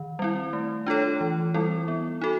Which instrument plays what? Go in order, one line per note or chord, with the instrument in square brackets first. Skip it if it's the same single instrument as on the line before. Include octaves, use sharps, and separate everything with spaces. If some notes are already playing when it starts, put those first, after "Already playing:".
Already playing: [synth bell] D#3
G3 C4 E4
A3
D4 F4 A4 C#5
E3
G3 C4 E4 A4
B3
D#4 F#4 A4